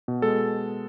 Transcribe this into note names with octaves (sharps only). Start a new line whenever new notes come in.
B2
G#3 A4